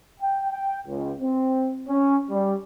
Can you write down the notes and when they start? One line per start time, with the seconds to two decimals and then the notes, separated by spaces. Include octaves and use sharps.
0.20 G5
0.51 G5
0.87 C#2
1.20 C4
1.89 C#4
2.30 G3